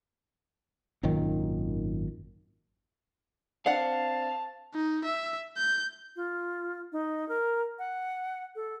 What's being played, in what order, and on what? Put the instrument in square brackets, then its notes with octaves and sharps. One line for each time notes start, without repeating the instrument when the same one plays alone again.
[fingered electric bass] G#1 F#2 A#2 D#3
[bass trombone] C4 [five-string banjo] D4 F#5 [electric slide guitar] F5 [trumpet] A5
[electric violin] D#4
E5
G6
[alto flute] F4
D#4
A#4
F#5
A4